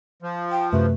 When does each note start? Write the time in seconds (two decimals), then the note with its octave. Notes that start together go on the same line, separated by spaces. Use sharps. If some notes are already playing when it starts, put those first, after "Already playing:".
0.22 F3
0.51 G5
0.72 F#2 C3 A3 B4